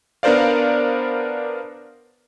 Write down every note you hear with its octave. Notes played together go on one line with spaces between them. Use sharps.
B3 D4 A#4 C5 D5 F5